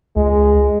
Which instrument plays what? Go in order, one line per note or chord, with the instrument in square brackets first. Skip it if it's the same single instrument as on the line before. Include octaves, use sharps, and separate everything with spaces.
[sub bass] C#2 [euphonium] G#3